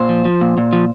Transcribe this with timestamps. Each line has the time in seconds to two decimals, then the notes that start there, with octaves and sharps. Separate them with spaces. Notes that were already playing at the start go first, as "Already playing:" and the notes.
Already playing: A#2 C5
0.09 F3
0.25 F3
0.41 A#2
0.58 A#2
0.73 F3